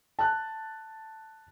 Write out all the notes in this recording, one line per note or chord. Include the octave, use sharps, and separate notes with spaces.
A5 F#6